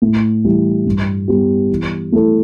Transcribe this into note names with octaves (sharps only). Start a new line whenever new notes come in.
A2
E3 G3 E4 G4
G2
G3 B3 G4
E3
A3 E4 A4